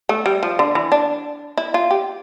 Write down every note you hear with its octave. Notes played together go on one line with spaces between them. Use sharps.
A3
G3
F3
D3
E3
D4
E4
F4
G4